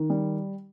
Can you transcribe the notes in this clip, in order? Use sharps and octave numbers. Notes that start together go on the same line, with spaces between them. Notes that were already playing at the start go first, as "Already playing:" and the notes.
Already playing: D#3
G3